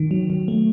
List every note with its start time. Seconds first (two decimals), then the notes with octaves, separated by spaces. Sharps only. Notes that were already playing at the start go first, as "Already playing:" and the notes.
Already playing: D#3
0.11 F#3
0.30 F#3
0.48 A3